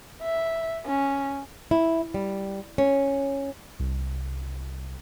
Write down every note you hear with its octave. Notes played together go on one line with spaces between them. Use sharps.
E5
C#4
E4
G3
C#4
C2